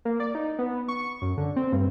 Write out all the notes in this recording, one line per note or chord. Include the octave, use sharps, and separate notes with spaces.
A#3
D5
D#4
B3
C#6
F#2
D3
C4
G2